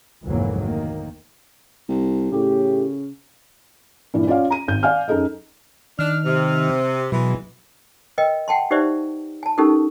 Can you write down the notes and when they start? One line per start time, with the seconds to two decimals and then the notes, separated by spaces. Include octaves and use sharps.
0.25 F1 D2 G#2 E3 F#3 A#3
0.60 D#3 A#3
1.89 C2
2.32 A2 C#3 G4
4.14 G2 A#2 E3
4.27 C#4 F4 C#5 D5 F5
4.50 A#5 D#7
4.68 G#1 G6
4.83 D5 F5 G#5 F6
5.08 F#2 D#4 G#4 A4 D#5
5.99 D#3 D4 F6
6.24 C3
7.12 B2 E3 F#3 G#3
8.18 A#4 B4 D#5 G5
8.48 F#5 G5 A5 C6
8.71 D#4 G4 B4 C5 D5 E5
9.43 G#5 A5
9.58 C#4 D#4 G4 A4 A#4